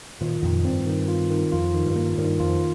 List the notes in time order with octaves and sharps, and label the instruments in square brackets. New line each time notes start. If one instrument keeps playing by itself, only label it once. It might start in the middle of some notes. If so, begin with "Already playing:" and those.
[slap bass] A#2 D#3 [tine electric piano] F4
[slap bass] F2 A#2 [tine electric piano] D#3
[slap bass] G2 [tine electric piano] C4
[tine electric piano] D#3
F4
D#3
[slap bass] F2 [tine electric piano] F4
[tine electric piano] D#3
[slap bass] G2
[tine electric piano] A#3
[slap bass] G2 [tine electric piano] D#3
[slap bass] F2 [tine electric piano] F4